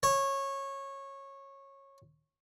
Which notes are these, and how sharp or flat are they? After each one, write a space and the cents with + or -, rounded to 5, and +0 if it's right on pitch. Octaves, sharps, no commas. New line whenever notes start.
C#5 -20